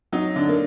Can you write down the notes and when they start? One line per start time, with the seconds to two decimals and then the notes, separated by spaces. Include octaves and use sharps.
0.12 F#3 D#4
0.36 D3 D4
0.49 A#3